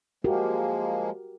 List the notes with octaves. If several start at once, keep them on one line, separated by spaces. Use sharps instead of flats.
F3 G#3 A#3 F#4 G4 A#4